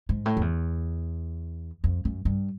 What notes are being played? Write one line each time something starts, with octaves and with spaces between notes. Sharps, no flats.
G#2
A2
F2
E2
F2
F#2
G2